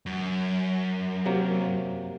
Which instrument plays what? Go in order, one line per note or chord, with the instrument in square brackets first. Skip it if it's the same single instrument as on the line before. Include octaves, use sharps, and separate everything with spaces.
[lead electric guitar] F#2
[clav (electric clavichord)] C3 F#3 A#3